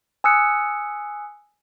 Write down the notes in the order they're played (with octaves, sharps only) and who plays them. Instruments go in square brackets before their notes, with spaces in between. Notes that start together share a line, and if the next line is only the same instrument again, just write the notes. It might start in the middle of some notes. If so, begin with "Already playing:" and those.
[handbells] G#5 D#6 E6 F#6 C#7